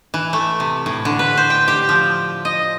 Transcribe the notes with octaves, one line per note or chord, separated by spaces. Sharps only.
E3
A3
C3
A2
D3
B4
C5
G5
G4
F3
D#5